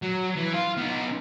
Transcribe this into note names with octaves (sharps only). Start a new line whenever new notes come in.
F#3
E3
F4
B3 D#4